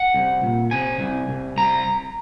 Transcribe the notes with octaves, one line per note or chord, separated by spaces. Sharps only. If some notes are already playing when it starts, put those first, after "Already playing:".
Already playing: F#5
C2
A#2
C3 G#5
C2
C2
C2 A#5